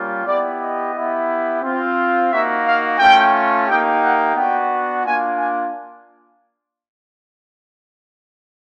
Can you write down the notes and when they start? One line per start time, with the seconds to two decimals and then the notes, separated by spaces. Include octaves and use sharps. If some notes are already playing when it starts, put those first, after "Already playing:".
Already playing: G3 A#3 C#4 F4
0.26 B3 E4 G4 D5
0.60 D#5
0.94 B3 E4 G4
1.62 C4 F4
2.31 A#3 D#4 F#4 E5
2.65 F5
2.99 A3 C#4 F4 G5
3.68 A#3 D#4 G4 G5
4.02 F#5
4.35 B3 D4 F#4 G5
5.04 A#3 D4 F4 G#5
5.38 G#5